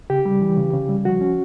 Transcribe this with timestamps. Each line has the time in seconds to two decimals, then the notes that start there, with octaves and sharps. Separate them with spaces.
0.10 C#3 G4
0.25 G3
0.42 E3
0.57 C#3
0.73 C#3
0.89 G3
1.05 F3 F#4
1.21 C#4